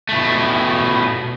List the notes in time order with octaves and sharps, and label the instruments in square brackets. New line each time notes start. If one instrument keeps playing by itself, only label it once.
[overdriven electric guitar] B2 A3